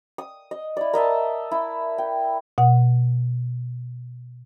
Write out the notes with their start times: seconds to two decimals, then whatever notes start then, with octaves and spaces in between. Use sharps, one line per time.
0.18 D#6
0.51 D#5
0.77 E4 D5
0.94 A#4 D#5 E5 A5
1.51 E4
1.98 G5
2.58 B2 F#5